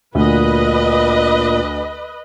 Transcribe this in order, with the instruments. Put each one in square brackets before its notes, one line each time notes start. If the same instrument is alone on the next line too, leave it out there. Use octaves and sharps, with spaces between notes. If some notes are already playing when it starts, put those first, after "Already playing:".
[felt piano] D2 [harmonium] A#2 [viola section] B4 D#5